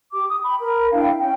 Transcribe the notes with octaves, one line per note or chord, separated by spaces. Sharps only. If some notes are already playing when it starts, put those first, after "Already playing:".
G4 D6
D#6
G5 B5
A#4 B5
D4 E4 F5 G5
C#4 G5